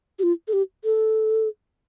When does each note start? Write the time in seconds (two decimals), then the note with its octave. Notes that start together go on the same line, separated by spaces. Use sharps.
0.19 G4
0.23 F4
0.48 A4
0.53 G4
0.84 A4